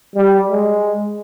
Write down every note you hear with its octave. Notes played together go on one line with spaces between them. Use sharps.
G3
G#3